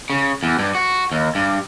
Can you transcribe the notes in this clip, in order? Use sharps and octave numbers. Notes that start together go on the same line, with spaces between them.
C#3
E2
G2
F#4
D#2
G2